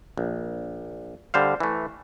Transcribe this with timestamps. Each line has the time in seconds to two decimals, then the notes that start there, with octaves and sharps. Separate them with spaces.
0.18 A#1
1.34 D3 G3 C5 F5
1.60 E3 A3